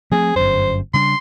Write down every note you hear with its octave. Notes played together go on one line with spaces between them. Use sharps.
F3 A3 C4 G#4
G1 F#2 C5
C#3 G3 D4 C6